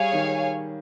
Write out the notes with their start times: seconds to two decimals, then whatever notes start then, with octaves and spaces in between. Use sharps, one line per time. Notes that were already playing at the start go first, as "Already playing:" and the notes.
Already playing: G3 G#4 C#5 F5 G#5
0.13 D#3